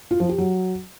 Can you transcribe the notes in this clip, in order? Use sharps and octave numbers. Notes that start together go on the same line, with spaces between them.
F4
F3
G4
F#3